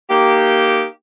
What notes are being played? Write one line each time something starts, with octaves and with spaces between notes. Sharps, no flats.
A#3 D#4 G4